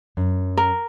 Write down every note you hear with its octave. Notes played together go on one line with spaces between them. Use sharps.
F#2
A#4